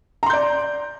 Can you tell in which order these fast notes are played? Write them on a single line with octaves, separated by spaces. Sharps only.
A#5 C6 G6 D5